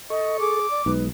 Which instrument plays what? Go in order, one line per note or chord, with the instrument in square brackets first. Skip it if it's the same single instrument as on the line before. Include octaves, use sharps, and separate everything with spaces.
[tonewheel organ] A4 C#6 [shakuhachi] D#5
[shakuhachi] G#4 [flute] D6
[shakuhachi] D5
[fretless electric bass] B1 [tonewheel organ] G#3 D#4 [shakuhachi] B4